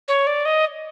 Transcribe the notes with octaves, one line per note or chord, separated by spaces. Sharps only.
C#5
D5
D#5